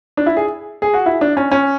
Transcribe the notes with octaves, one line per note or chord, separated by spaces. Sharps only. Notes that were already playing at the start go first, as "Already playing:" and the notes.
D4
E4
G#4
G#4
F#4
E4
D4
C#4
C#4